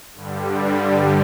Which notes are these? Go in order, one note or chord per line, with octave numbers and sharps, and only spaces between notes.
G2 D3 G3